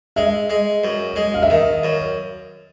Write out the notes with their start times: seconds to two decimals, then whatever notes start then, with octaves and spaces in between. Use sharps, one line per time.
0.16 G#3 E5
0.50 G#3
0.84 F#2
1.16 G#3
1.34 F5
1.42 E5
1.50 D#3 D#5
1.84 F#2